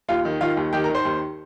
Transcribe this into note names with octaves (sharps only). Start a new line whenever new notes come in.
D#2 F4 F5
D#3
D#3 F4 F5
D#2
D#3 G4 G5
A#4 A#5
D#3
C5 C6
D#2